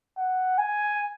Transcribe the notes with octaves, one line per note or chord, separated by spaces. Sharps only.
F#5
G#5